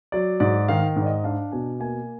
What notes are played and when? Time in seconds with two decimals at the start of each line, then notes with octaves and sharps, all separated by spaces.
0.12 F#3 D5
0.40 G#2 D5
0.68 D#3 F5
0.96 G#2
1.02 D5
1.06 D#5
1.24 D4 F5
1.52 B2 G#5
1.80 A#3 G#5